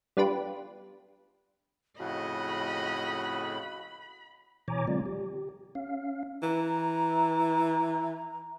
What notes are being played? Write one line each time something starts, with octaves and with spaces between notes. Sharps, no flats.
G3 B3 D4 F4 G4 B4
F2 A2 C#3 F#4 D#5 B5
B2 E3 C#5 G#5 A#5 D6
D3 F#3 G#3 C4 F4 D5
G4
C#4 F5
E3 A#5